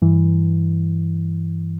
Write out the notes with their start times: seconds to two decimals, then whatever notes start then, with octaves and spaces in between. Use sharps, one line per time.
0.02 G2 E3